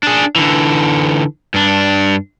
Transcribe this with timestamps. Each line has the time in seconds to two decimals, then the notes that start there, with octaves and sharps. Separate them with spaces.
0.03 D4 G#4
0.36 D3 E3
1.54 G2 D4